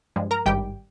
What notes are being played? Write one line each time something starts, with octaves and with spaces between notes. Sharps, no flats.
G2 F3 G#3
A#4 A#5
G#1 G2 D#3 G3 G4 G5